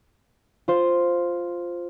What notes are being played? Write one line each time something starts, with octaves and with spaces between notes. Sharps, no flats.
F4 C5